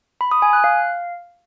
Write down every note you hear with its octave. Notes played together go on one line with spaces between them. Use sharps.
B5
D#6
G#5
F#6
F5